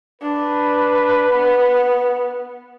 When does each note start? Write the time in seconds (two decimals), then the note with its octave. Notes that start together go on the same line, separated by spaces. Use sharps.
0.22 D4 B4
1.31 B3